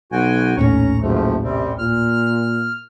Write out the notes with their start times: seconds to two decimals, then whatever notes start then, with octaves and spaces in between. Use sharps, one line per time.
0.12 B1 F#4 G5 G#5
0.57 A#1 D#2 A2 C#4 A#5 C#6
1.01 F#1 F3 A3
1.43 F#2 C3 G3 C4
1.79 A#2 F6